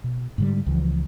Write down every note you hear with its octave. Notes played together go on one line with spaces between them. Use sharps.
B2
G#2 D3 G3
C#2 E3 F3